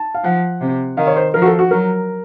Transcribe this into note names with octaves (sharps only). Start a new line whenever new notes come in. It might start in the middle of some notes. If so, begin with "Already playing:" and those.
Already playing: A5
F5
F3 F#5
C3
D#3 F5
C#5
C5
F3 A#4
F#4
A4
F#4
F#3 A#4